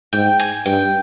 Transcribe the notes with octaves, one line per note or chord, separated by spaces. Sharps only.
G#2 G5
G#5
G2 G5